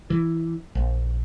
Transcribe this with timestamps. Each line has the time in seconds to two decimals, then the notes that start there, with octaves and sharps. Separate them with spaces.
0.10 E3
0.75 A#1